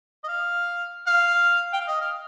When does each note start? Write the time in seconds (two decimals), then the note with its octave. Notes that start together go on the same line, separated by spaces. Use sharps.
0.24 D#5
0.28 F5
1.07 F5
1.73 G5
1.81 F5
1.87 D#5
2.01 F5